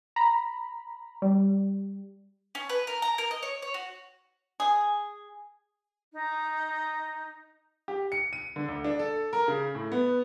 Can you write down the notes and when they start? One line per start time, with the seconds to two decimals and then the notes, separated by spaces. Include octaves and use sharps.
0.16 A#5 B5
1.22 G3
2.55 C#4
2.69 B4
2.87 A#4
3.02 A#5
3.18 A#4
3.31 D#5
3.43 C#5
3.62 C#5
3.74 F#4
4.60 G#4
6.12 D#4
7.88 G4
8.12 C#7
8.33 D#7
8.56 D3
8.68 D2
8.84 D4
8.99 A4
9.33 A#4
9.48 C#3
9.75 A2
9.92 B3